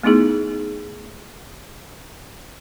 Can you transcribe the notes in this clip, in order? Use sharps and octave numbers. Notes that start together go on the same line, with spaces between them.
A3 B3 D#4 E4 G#4